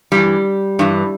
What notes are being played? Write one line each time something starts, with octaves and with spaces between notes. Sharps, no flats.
G2 E3 G3
G2 E3